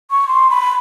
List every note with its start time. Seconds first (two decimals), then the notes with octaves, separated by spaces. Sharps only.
0.10 C#6
0.28 C6
0.50 B5